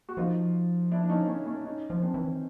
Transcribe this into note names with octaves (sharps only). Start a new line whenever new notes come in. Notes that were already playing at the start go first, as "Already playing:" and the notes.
F#4
F3 D#4 F4
D4 E4
D4
C#4 D#4
C#4 D#4
C#4 D#4
C#4 D#4
F3
C4 D4
E3